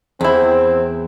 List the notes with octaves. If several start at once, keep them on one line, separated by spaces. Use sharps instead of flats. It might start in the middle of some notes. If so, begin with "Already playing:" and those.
E2 C4 E4